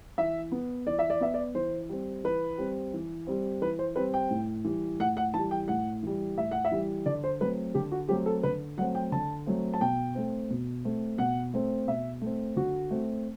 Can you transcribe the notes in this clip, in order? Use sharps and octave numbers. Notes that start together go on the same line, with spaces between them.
E3 E5
B3
E3 D5
E5
D5
B3 E5
D5
E3 C5
G3 C4
E3 B4
G3 C4
E3
G3 C4
E3 B4
C5
G3 C4 B4
G5
A2
E3 G3
A2 F#5
F#5
E3 G3 A5
G5
A2 F#5
E3 G3
A2 E5
F#5
E5
E3 G3
D3 D5
C5
F#3 A3 C4 B4
D3 G4
F#4
F#3 A3 C4 G4
A4
D3 B4
F#3 A3 C4 F#5
G5
D3 A5
F#3 A3 C4
A5
B2 G5
A3 C4
B2
A3 C4
B2 F#5
A3 C4
B2 E5
A3 C4
D3 F#4
A3 C4